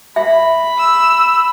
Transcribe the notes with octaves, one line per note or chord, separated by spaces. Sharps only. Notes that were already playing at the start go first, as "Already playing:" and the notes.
E5 B5
E6